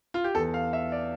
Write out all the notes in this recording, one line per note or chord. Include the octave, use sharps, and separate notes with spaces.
F4
G4
E2 E3 A4
F5
E5
D5